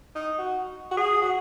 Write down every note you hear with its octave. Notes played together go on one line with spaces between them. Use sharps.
D#4
F#4
F#4
G#4
F#4